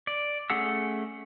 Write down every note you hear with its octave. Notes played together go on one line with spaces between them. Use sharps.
D5
A3 C#4 G#4 F#5 E6